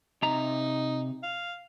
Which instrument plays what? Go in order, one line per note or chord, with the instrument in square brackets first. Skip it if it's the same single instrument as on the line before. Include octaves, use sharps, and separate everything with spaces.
[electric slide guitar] C3 A#5 [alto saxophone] D#4
[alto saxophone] F5